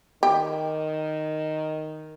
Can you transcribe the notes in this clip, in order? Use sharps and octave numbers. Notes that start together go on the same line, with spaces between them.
D#3 G4